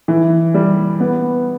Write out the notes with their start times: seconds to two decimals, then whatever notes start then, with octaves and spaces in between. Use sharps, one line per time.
0.08 E3
0.54 G3
1.00 B3